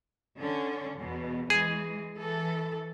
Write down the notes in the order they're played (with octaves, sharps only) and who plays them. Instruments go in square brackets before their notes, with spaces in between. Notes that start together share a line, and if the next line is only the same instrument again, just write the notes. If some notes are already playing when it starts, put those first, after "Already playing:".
[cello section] D3 C#4
E2 B2
[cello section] E3 G#3 [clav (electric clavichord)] G#4
[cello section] E3 A4